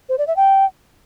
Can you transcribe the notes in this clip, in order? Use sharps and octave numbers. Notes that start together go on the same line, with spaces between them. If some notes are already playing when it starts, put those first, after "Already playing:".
C5
D5
E5
G5